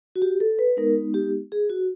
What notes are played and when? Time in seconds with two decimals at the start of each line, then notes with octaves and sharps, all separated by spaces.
0.16 F#4
0.22 G4
0.40 A4
0.59 B4
0.77 G#3 B3 D#4 A#4
1.14 G4
1.52 G#4
1.70 F#4